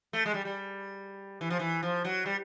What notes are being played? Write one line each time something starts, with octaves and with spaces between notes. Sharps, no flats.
A3
G#3
G3
G3
E3
F3
E3
F3
F#3
G3